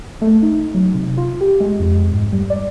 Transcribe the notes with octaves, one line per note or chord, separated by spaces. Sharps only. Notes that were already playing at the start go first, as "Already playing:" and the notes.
A3
D#4
F#3
C3
F4
G4
G#3
F2
G#2
G3
D5